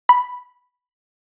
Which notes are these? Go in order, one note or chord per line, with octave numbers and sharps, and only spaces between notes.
B5